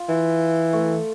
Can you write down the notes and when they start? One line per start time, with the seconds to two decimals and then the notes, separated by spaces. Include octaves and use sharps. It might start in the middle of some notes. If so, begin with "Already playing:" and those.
Already playing: F4
0.09 E3
0.73 A3